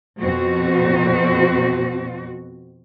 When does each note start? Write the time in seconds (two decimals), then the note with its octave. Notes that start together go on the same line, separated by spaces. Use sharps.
0.20 F2 B2 C4 F#4